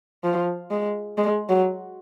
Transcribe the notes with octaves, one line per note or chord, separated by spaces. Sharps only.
F3
G#3
G#3
F#3